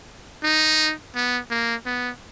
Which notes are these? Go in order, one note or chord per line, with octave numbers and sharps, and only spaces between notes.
D#4
B3
A#3
B3